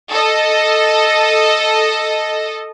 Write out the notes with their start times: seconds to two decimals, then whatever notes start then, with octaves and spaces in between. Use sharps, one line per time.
0.11 A4 D#5